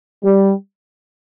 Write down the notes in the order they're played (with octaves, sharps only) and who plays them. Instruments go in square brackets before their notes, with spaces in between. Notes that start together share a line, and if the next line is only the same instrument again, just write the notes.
[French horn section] G3